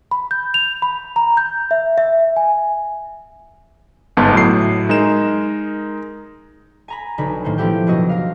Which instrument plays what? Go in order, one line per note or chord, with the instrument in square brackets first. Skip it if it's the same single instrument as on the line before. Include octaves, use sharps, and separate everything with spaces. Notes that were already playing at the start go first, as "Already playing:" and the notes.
[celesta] B5
G6
F7
B5
A#5
G6
E5
E5
G#5
[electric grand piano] G1 G#2 B3 A5
A2 F#3 C7
G#3 D#4 A#4 E7
[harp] G#5 A#5 B5
B1 D3 D#4 B5
A2 D#3 A#3 C5
F3 B3 D4 E4 G4 G5
F#1 B2 F#3 F#4 D#5 E6
A#4 F5